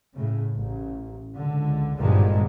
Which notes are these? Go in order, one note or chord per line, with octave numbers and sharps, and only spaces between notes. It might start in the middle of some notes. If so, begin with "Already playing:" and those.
A2 C#3
A1
C#2 D3
G#1 G2 A#2 D3 D#3 G#3